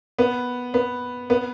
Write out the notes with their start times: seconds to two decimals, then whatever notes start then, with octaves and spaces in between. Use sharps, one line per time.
0.19 B3
0.74 B3
1.30 B3